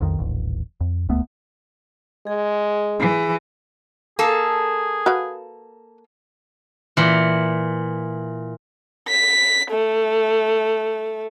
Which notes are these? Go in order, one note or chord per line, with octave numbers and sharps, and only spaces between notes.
B1 F2 D#3
D#1 A1
F2
D#1 C#2 A3 B3
G#3 G#4
E3
A#3 G#4 A4
F#4 B4 F5
A#2 E3
B6
A3